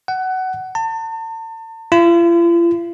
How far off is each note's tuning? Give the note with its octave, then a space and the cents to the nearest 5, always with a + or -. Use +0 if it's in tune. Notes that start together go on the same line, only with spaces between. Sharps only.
F#5 +20
A5 +40
F4 -45